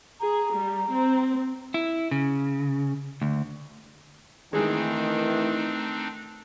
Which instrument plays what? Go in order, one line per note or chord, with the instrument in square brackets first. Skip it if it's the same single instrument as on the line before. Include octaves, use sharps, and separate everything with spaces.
[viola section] G#4 [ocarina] A#5
[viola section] G3
C4
[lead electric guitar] E4
C#3
D2
[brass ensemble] D#3 E3 [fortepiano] G#3 G#4 [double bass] A3 [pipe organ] C4 D4 D#4